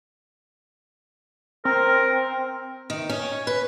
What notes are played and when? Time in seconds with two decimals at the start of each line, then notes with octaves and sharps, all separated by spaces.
1.65 C4 A#4
2.90 D#3
3.09 C#4
3.47 B4